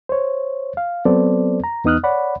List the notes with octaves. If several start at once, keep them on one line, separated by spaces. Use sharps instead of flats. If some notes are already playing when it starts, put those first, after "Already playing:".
C5 C#5
F5
F#3 B3 C4 A4 C5 D5
A#5
E2 B3 D#4 D#6 F6 F#6
C#5 D5 F#5 B5